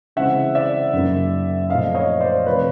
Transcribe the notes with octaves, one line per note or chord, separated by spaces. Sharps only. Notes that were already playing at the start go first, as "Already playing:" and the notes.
C#3 E3 G#3 C4 E5 F#5
D5 E5
F#2 C#3 F#3 A#3 D#4
A#2 F3 A3 C4 D#4 D#5 F5
C#5 D#5
C5 D5
C3 F3 A3 B4 C#5